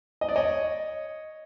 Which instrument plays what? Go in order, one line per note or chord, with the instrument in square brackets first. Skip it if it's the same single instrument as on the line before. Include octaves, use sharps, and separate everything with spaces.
[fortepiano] D#5
D5
C#5 D#5